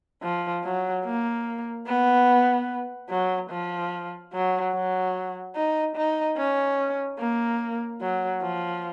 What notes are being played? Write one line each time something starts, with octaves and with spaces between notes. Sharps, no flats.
F3
F#3
A#3
B3
F#3
F3
F#3
F#3
D#4
D#4
C#4
A#3
F#3
F3